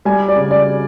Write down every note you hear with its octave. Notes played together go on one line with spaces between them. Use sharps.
G3 G#5
D5
C#3
D5